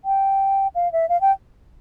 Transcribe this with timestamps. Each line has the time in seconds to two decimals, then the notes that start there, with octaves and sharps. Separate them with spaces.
0.05 G5
0.75 F5
0.93 E5
1.09 F5
1.21 G5